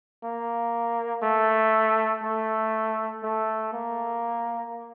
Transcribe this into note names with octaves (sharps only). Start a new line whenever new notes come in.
A#3
A3
A3
A3
A#3